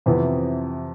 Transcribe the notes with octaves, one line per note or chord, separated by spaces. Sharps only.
F2 C3 E3 B3